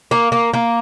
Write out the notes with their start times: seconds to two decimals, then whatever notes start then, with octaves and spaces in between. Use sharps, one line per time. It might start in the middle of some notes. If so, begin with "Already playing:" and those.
0.11 A#3
0.32 A#3
0.54 A#3